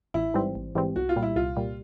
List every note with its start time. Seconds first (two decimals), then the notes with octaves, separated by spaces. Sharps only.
0.14 A1 E4
0.34 G#2 E3 G3 C4
0.55 A1
0.75 G#2 E3 G3 C4
0.96 C2 F#4
1.09 F4
1.16 A#2 G3
1.23 E4
1.36 C2 F4
1.57 A#2 G3